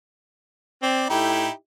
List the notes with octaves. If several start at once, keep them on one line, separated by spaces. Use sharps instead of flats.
C4 D5
A2 D#4 E4 G4